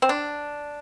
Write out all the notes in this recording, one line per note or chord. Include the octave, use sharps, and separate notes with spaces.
C4
D4